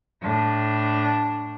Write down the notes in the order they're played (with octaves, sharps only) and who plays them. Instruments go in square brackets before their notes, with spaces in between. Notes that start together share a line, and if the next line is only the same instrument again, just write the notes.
[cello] A2 D4